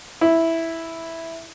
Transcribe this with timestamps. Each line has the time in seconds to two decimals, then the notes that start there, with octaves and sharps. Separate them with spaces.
0.21 E4